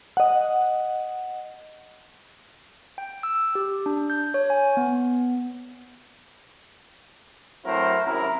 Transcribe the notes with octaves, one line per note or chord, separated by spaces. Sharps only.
D#5 F#5
G5
E6
G4
D4
G6
C#5
G#5
B3
F#3 A3 C4 E4 A#4 C5
G#1 F#2 C3 E4 A#4